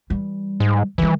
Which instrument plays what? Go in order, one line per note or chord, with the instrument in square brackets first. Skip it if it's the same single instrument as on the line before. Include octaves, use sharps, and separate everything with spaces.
[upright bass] E3 G3
[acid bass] G#2
[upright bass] D#3 G3 [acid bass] E3